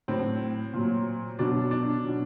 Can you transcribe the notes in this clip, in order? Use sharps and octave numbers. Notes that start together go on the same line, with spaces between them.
A2 F#3 C4
A#2 F#3
B2 F#3 D4
D4
B2 F#3